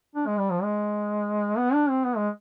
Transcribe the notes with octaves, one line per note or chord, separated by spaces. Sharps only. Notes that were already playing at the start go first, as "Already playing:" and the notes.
D4
G#3
G3
F3
G#3
B3
D4
C4
B3
G#3